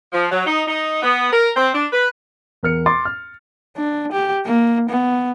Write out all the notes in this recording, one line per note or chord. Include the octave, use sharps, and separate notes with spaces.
F3
F#3
D#4
D#4
B3
A#4
C4
D4
B4
E2 A#4 F6 C#7
C6 D6 A6
F6
D4
G4
A#3
B3